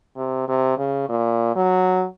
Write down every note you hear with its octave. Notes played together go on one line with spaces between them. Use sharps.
C3
C3
C#3
A#2
F#3